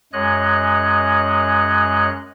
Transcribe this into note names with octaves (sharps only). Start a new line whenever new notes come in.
F#2 G#3 C#5 D#5 F#6